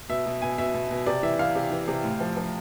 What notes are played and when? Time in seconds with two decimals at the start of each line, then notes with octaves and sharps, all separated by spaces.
0.09 B2 E5
0.26 B2
0.42 B2 G#5
0.58 B2 E5
0.74 B2
0.91 B2
1.06 C3 D5
1.23 E3 E5
1.39 E3 F5
1.55 C3
1.72 E3
1.88 C3
2.04 A2
2.20 F3
2.37 F3